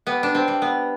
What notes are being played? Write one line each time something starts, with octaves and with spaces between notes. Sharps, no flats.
G3 B3
D4
C4
G3
B3